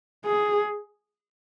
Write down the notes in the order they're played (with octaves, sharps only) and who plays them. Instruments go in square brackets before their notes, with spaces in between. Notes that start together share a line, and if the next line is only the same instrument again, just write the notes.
[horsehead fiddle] G#4